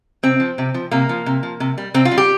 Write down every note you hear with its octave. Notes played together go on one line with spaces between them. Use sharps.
C3 C4
F3
C3
F3
C3 A#3
F3
C3
F3
C3
G3
C3 C4
F4
G3
G4